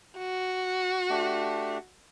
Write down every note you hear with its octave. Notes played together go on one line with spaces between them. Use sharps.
F#4
A3 D4 G4